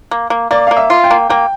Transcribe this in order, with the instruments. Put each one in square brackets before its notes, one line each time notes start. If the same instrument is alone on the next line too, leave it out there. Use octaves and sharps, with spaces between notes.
[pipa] A#3
A#3
[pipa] A#3 [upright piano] D5
[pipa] A#3 [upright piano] F5
[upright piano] E5
[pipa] F4
[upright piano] G5
[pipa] A#3
[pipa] A#3 [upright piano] G5